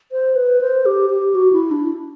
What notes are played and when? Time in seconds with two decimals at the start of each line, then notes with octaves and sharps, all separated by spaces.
0.12 C5
0.35 B4
0.61 C5
0.86 G4
1.10 G4
1.35 F#4
1.53 E4
1.71 D4